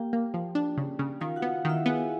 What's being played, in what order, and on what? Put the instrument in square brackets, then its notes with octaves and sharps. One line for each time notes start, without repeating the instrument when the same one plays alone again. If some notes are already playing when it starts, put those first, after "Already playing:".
Already playing: [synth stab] A#3 [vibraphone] G4 G5
[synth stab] A#3
F3
D4
C#3
C#3
[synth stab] D#3 [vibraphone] F4 F5
[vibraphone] F#4 F#5
[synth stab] B3
[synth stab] D#3 [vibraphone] E4 E5
[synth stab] B3 [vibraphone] G#4 G#5
[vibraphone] G#5